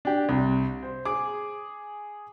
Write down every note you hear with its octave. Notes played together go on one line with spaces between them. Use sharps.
D4 G4
C2
C5
G#4 D6